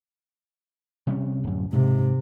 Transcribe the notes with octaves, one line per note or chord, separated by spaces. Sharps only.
C3 G3 C#4
D1 F#2
G#2 C3